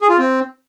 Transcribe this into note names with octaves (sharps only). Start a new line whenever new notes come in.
G#4
F4
C4